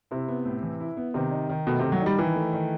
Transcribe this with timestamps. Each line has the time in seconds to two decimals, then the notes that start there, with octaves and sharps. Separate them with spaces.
0.11 C3 E4
0.28 B3
0.45 A2
0.63 E3
0.80 E4
0.97 B3
1.14 C3 D#3
1.31 D#4
1.49 D#3
1.67 B2 A3
1.80 C3 D#3
1.92 F#3
2.02 G3 D#4
2.18 D#3 E3
2.35 A3
2.53 D#3